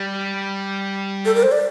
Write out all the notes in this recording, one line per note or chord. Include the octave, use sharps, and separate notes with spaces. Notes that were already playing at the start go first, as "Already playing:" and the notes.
Already playing: G3
A4
A#4
C5
D5